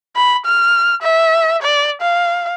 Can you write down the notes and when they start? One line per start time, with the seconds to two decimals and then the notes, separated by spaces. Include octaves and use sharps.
0.16 B5
0.46 F6
1.02 E5
1.62 D5
2.01 F5